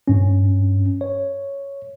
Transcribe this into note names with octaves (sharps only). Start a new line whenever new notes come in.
G2 C#4
C#5